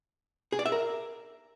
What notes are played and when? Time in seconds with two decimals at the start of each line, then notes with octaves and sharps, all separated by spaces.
0.52 G#4
0.59 D5
0.66 E5
0.72 A#4